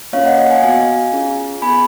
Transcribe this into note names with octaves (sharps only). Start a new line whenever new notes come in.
A#3 C#4 F4 C#5 F5
D#5 F#5
D#5 F#5
F5 G#5
B3 F#4 F5 G#5
C#4 F4 G#4
B3 F4 G#4 G#5 B5